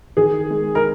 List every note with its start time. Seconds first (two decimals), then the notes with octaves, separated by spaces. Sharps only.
0.17 D#3 G#4
0.51 G#3
0.75 A#4